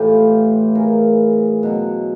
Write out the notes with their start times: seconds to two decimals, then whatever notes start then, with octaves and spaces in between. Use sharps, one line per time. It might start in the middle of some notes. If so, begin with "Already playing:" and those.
Already playing: A2 E3 F4 G4
0.75 G#4 A#4
1.63 B2 F#3